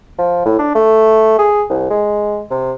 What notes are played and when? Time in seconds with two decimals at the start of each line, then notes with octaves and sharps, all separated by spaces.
0.19 F3
0.46 A2
0.59 D4
0.75 A3
1.39 G#4
1.70 C2
1.90 G#3
2.50 C3